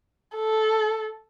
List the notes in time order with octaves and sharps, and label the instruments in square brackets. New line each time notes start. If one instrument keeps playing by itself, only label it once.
[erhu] A4